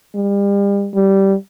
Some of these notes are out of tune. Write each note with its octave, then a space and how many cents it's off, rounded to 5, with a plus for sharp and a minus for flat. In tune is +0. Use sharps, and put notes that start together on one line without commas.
G3 +35
G3 -10